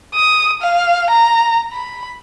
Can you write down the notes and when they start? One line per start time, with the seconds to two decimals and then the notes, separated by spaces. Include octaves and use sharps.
0.14 D#6
0.62 F5
1.10 A#5
1.72 B5